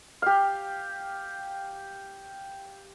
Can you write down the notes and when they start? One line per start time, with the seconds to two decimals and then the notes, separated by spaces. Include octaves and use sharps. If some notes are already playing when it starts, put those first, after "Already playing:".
0.22 G4 F5